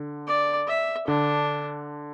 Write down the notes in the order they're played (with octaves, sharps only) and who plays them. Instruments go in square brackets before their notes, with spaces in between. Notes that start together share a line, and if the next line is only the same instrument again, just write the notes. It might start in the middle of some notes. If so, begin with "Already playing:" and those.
Already playing: [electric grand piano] D3
[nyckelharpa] D5
E5
[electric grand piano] D3 [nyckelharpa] D4